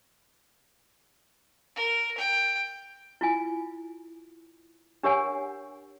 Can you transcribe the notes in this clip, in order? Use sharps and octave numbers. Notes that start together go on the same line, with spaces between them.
A#4
G5
E4 F4 G#5
D4 G4 A#4 C#5 F#5 G#5